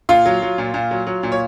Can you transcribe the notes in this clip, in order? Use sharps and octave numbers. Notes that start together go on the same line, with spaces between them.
A#2 F4 F5
F#3
F#3
A#2
A#2
F#3
F#3
A#2
C#5